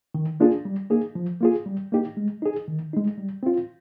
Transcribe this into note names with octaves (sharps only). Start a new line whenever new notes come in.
D#3
A#3 D4 F4 G#4
G3
A#3 D#4 G#4
F3
A#3 F4 G#4
G3
A#3 D#4 G4
G#3
D#4 G#4
D#3
G#3 D#4
G3
C4 F4